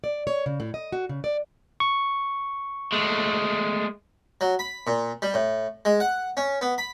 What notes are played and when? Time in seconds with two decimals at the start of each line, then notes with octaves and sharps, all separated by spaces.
0.04 D5
0.27 C#5
0.46 C#3
0.60 A2
0.74 D#5
0.92 F#4
1.09 C#3
1.24 D5
1.80 C#6
2.92 G#3 A3
4.41 F#3
4.59 B5
4.87 A#2
5.22 G3
5.34 A2
5.85 G#3
6.00 F#5
6.37 C#4
6.61 B3
6.78 B5